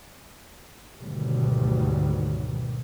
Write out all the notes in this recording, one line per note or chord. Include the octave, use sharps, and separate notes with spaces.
D2 G#2 B2 D#3 F#3 G3